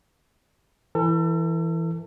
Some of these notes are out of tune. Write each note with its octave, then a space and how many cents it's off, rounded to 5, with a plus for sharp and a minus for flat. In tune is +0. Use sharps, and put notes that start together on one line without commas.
E3 +0 A4 +35